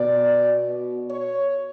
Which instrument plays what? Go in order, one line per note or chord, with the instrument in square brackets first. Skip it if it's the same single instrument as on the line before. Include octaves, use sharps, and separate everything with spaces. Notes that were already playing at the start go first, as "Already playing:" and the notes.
Already playing: [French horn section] B2 D5
C#5